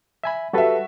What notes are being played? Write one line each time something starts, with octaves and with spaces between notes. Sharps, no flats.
E5 G#5 B5
G3 F#4 A4 B4 E5